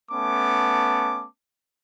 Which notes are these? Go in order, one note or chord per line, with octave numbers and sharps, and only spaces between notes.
A3 B3 C#4 A5 D6